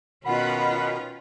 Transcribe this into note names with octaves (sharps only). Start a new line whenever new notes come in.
B2 D#3 C#4 F4 F#5 B5